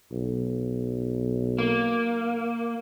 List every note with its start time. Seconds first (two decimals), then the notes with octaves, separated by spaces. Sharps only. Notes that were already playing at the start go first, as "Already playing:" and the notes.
0.12 B1
1.58 A#3